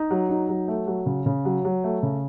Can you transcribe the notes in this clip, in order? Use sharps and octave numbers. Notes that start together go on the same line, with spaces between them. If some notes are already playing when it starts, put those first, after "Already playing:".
Already playing: D#4
F#3
D#4
F#3
A3
F#3
C#3
C#3
F#3
F#3
A3
C#3